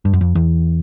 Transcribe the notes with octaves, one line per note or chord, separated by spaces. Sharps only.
G2
F#2
F2
E2